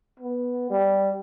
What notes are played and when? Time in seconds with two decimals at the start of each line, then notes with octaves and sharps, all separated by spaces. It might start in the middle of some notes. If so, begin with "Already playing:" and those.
0.20 B3
0.70 G3